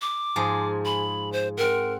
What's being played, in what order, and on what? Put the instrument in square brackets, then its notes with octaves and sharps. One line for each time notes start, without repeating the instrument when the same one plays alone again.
[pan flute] D6
[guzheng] G#2 F3 G#4
[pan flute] B5
C5
[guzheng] C4 F#5 [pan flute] A#4